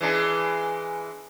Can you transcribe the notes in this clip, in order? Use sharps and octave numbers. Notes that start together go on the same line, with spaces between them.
E3 G#3 D4